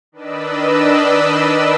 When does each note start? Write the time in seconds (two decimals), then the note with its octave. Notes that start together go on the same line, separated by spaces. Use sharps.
0.12 D#3 D4 B4 D5 D#5 E6